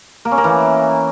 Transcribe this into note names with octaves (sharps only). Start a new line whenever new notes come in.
A#3
C#4
A#3
E3